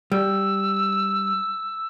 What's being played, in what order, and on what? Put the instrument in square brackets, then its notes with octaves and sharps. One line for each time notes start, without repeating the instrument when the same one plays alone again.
[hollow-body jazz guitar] G3 [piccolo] E6